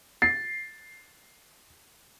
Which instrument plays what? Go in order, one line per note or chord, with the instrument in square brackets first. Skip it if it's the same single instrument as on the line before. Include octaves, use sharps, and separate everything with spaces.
[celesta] A6 [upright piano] C7